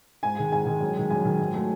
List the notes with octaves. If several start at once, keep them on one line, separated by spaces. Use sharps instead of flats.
G#2 G#5
D#3 G#3
G#2 G#5
D#3 G#3
F#2
D#3 G#3
F#2 G#5
D#3 G#3
G#2
F#3 A3